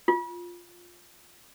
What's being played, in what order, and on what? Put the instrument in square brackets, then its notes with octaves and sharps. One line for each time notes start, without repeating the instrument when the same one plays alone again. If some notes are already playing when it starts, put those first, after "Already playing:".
[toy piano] F4